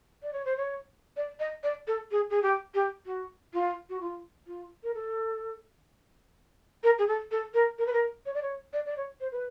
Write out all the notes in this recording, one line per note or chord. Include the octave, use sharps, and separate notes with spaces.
D5
C#5
C5
C#5
D5
D#5
D5
A4
G#4
G#4
G4
G4
F#4
F4
F#4
F4
F4
A#4
A4
A#4
G#4
A4
A4
A#4
A#4
B4
A#4
C#5
D5
C#5
D5
D5
C#5
C5
B4